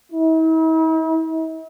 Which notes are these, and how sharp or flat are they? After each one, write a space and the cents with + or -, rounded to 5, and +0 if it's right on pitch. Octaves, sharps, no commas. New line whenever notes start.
E4 -45